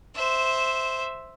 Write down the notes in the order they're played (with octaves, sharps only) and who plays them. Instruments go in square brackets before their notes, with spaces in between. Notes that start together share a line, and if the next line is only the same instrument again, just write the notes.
[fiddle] C5 E5